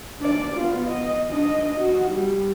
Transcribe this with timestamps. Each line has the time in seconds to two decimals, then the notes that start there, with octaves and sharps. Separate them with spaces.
0.20 D4 D5
0.57 B3 F4
0.86 D#5
1.29 D4 D#5
1.78 F#4
2.12 G3